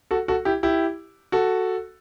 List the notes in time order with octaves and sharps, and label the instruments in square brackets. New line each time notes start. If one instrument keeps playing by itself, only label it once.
[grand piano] F#4 A4
F#4 A4
E4 G4
E4 G4
F#4 A4